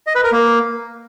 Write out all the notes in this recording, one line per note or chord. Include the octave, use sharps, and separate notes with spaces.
D#5
B4
A#4
A#3